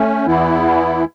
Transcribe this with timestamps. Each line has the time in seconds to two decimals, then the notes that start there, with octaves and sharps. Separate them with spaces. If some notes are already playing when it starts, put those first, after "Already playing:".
Already playing: A3 C#4
0.26 E2 E3 B3 E4